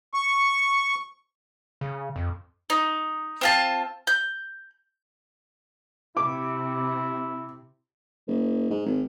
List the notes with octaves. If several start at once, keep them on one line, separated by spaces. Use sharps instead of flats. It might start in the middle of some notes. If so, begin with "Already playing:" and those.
C#6
C#3
F2
D#4
C4 F4 A5
G6
C3 E4 D6
F#1
G#2
G#1